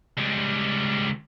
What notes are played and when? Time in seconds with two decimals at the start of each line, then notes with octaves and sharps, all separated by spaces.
0.18 C#2 G3